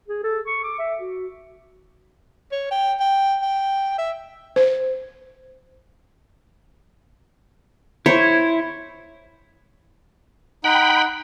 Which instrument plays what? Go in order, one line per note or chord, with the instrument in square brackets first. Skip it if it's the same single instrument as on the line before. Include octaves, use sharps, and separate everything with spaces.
[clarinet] G#4
A4
C#6
D6
E5
F#4
[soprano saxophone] C#5
G5
G5
G5
E5
[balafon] C5
[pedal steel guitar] E4 [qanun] C5 C#5
[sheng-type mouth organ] D#4 F#5 [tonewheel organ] G5 B5